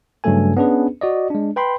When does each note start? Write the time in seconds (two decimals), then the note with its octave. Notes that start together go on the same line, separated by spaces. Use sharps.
0.24 G2 C#3 F#3 A3 A4 G#5
0.57 B3 C#4 D4 G#4 B4
1.01 F#4 D5 D#5
1.30 G#3 D4
1.56 B4 G5 B5 C6